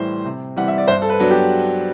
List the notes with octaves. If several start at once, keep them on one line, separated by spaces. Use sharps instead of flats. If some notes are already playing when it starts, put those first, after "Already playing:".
Already playing: A2 E3 G3 C5
C3
E3 G3 C4 F#5
E5
D5
G2 C5
A4
B4
F#3 B3 D4
G4